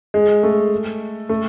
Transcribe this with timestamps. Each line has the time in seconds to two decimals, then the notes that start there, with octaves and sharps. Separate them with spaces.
0.14 G#3
0.43 A3
1.29 A3